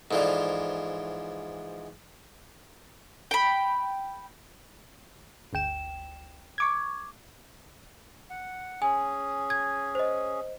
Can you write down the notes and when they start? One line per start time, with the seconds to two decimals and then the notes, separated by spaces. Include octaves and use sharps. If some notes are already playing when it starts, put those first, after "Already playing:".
0.11 G#2 E3 F3 A4 D5
3.31 G5 B5
5.53 G1 D2 G5 E7
6.58 C#6 D6 G#6
8.30 F#5
8.82 C#4 G#4 G#5
9.50 G#6
9.95 C5 D#5